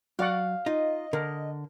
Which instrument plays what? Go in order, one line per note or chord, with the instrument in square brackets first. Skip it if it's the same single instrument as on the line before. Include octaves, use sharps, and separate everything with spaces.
[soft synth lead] F#3 [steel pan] F#4 D5 F#5 [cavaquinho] F5
[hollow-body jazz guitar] D#4 F4 [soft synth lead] D#5
[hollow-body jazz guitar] D3 [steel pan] A#4